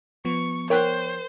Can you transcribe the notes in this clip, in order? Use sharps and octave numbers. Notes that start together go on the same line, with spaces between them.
F3 B3 C#6
A#4 C5 C#5 G5 F#6